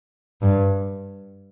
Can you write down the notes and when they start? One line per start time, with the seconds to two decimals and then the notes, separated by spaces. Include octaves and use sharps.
0.42 G2